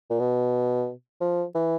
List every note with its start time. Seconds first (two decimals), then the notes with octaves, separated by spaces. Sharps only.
0.10 A#2
0.20 B2
1.21 F3
1.55 E3